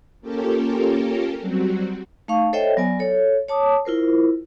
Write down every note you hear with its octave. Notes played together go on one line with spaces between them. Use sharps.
A#3 C#4 F4 G4 A4 A#4
F#3 G3 C4 F#4
A3 D#4 F5 C#6
A4 C5 C#5 D#5 E5 G5
F#3 B3 D5 G#5
A4 C#5
C#5 A5 D6 D#6
E4 F4 A#4 C5